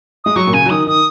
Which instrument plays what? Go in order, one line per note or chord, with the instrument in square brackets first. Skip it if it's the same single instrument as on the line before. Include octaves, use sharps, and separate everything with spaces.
[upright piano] G#3 [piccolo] D#6
[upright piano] F#3 [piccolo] C#6
[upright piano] A#2
[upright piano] C#3 [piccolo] G#5
[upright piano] F#3
[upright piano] D#3 [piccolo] D#6
[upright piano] D#3 [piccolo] D#6